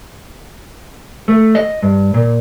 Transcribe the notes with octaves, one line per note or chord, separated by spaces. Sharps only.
A3
D#5
G2
A#2